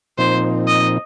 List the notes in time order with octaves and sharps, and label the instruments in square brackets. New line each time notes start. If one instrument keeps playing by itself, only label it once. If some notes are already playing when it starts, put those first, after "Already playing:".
[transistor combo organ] A#2 F3 C4 D#4 [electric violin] C5
[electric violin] D#5